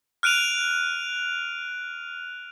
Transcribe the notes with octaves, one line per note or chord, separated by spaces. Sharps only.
F6 F#6 D7 D#7 F7